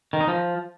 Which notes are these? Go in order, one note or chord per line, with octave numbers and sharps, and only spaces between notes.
D#3
D#4
F3